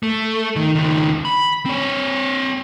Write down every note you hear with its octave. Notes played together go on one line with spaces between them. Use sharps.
A3
D#3
C#2 D#3
B5
C4 C#5